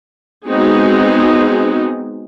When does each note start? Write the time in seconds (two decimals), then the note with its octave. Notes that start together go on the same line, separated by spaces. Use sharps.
0.47 G#3 B3 C4 D#4 F#4 G#4